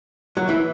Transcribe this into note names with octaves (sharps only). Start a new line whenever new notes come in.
F#3
E3